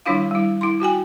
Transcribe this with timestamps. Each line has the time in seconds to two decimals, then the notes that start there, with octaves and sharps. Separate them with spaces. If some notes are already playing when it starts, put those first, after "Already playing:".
0.06 D#3 G3 D4 E4 F4 F5
0.31 G3 E4
0.61 E4 C6
0.80 F4 F#4 G5 G#5